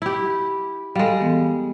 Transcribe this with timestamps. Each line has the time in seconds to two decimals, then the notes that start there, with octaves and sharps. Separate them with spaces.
0.02 E4 G4
0.96 G3 G#3 A4 F5
1.21 E3 B3